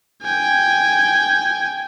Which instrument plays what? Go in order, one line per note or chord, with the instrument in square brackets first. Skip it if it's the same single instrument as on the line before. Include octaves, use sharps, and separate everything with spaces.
[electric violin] G5 G#5